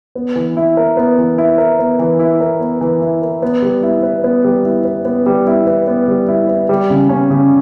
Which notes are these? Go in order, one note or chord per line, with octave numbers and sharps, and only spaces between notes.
B3
E3
E4
A#4
B3
E3
E4
A#4
B3
E3
E4
A#4
B3
E3
E4
A#4
B3
G3
E4
B4
B3
G3
E4
B4
B3
G3
E4
B4
B3
G3
E4
B4
G3
C#3
C#4
C#3